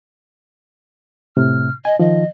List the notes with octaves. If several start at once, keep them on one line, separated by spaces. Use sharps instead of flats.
A2 C3 F6
D#5 G#5
D#3 F3 D#5